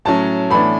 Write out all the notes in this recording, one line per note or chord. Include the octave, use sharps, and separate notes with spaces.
A2 F#3 C#4 A5
A2 E3 B3 D4 B5